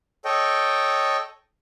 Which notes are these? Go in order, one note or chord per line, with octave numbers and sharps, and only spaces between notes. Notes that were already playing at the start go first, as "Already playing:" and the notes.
A4 C#5 D#5 G5